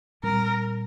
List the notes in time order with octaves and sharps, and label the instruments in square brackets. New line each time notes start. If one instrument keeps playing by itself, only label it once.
[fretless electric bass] A#2 G3 C4 [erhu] A#4